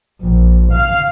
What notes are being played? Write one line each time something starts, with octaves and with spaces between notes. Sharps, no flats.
A#1
F5